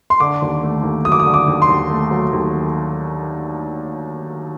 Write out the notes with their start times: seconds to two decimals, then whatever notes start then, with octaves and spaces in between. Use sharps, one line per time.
0.10 C6
0.20 D3 D6
0.42 D#2
0.63 A3
0.83 D#2
1.05 F#3 D#6
1.12 D6
1.20 D#6
1.26 D3
1.34 D6
1.48 D#2
1.62 C6
1.69 D#2
1.90 A3
2.11 F#3
2.33 D#2